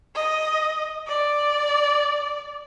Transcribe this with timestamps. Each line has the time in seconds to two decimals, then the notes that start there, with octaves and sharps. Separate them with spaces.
0.15 D#5
1.08 D5